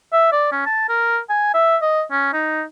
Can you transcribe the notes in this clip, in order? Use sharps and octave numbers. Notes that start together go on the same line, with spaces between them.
E5
D5
C#4
A5
A#4
G#5
E5
D#5
C#4
D#4